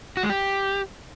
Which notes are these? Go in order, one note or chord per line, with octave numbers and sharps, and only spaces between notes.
F#4
G#3
G4